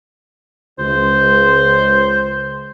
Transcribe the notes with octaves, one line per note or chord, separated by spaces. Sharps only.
C#2 C5